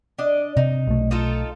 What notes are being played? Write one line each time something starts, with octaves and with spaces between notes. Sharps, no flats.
D4 D5 D#5
C3 D#4
B1 A3
D#4 F4 A4